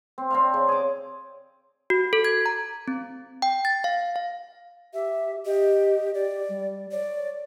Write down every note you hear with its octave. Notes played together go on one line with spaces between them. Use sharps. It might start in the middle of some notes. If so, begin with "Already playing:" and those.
C4
C4 D4 F5
C#3
G#4 D6
F#4
A4
G#6
A#5
C4
G5
A6
F5
F5
G4 E5
G4 D#5
G4 D5
G3
C#5 D5